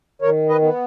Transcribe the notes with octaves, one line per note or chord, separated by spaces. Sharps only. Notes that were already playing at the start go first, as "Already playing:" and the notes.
D#3 A#4 C#5
B4 D#5
B3